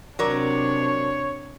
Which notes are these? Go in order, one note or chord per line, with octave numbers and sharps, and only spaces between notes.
C3 F#3 D4 A#4 C#5 D5